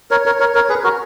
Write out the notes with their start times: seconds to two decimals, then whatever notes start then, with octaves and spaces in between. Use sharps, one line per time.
0.11 A#4 C#5
0.26 A#4 C#5
0.40 A#4 C#5
0.55 A#4 C#5
0.69 G#4 B4
0.84 F#4 A#4